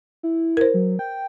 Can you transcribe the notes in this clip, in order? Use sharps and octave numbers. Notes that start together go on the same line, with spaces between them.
E4
A#4 C5
F#3
G5